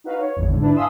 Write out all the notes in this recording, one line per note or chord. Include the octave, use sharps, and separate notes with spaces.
D#4 F#4 B4 F5
C#5
G#1 E2
G#2 D3
D4 E4 B4 A5
F5 G#5 B5 C6 D#6 E6